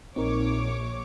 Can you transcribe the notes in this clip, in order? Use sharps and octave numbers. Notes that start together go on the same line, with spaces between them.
A#1 C4 D#4 A#4 C#5 D6